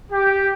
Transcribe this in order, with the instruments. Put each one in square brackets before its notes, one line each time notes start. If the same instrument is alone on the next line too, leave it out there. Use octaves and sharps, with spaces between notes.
[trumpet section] G4